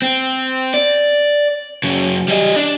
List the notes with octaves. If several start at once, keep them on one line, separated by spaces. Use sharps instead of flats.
C4
D5
F#2 C#3
G3 D#5
D4